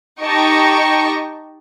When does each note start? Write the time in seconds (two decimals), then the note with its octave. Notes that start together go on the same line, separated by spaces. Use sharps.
0.21 D#4 G4 D#5 G5 A5 C#6